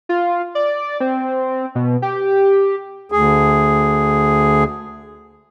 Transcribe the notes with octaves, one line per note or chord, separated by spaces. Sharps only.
F4
D5
C4
B2
G4
D2 G#4